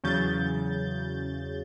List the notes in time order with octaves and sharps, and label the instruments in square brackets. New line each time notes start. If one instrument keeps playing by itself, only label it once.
[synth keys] E2 C#3 F#3 G6 A6